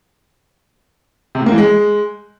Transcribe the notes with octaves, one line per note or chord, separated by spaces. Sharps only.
C3
A2
A#3
E3
G#3